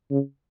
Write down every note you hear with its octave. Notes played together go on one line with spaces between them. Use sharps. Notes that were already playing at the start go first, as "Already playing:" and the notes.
C#3